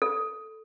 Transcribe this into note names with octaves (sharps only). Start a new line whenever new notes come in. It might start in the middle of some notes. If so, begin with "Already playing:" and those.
A4